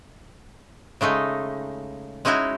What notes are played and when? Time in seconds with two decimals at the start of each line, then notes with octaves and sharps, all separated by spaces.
1.01 C#3 G#3 A3 D#4
2.25 G#3 C#4 D#4 E4 F#4